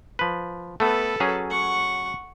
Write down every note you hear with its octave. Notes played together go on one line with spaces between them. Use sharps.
F3 B4
A3 B3 A4 B4
F#3 C#4 G#4
F#5 C#6